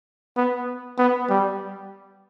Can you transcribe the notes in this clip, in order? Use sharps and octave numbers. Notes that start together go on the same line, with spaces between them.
B3
B3
G3